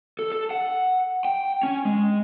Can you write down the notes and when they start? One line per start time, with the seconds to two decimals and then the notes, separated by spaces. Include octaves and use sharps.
0.19 A4
0.32 A4
0.51 F#5
1.25 G5
1.63 C#4
1.85 G#3